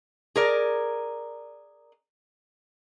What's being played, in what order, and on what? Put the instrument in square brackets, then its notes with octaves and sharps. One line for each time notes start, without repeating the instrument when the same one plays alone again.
[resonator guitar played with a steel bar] G#4 A#4 D5